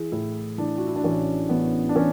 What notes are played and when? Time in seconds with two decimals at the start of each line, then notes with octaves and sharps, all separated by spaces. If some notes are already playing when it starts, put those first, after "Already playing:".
Already playing: E3 G#4
0.12 A2 E4
0.58 E3 D4
0.78 F#4
0.87 E4
0.96 D4
1.04 A1 C#4
1.49 A1 B3
1.89 D4
1.96 E3 C#4